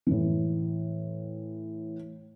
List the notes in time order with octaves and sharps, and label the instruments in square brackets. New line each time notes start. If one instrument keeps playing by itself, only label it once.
[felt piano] A2 E3